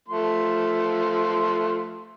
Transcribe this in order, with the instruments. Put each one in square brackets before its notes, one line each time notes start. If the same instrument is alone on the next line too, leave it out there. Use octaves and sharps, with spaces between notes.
[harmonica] F3 A3 C6